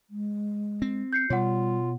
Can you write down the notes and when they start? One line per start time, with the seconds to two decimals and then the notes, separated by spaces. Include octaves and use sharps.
0.10 G#3
0.82 C4
1.13 G6 C7 C#7
1.30 B2 G3 F4 C#5 F#5